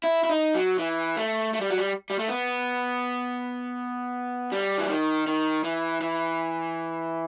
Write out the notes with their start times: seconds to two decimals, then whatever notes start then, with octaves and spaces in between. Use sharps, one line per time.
0.04 E4
0.24 E4
0.30 D#4
0.55 F#3
0.79 E3
1.17 A3
1.54 A3
1.61 G3
1.70 F#3
1.78 G3
2.10 G3
2.19 A3
2.28 B3
4.52 G3
4.78 E3
4.89 D#3
5.27 D#3
5.64 E3
6.02 E3